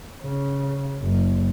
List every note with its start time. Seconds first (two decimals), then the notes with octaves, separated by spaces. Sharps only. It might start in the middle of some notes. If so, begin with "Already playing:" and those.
0.22 C#3
1.02 F#1